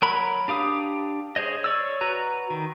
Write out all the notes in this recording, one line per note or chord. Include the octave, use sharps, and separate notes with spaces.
F#3 A#4 B5
D4 G4 F5 D#6
G#4 C5 C#5 D#5
C#5 D5 E6
F#4 B4 A#5
D#3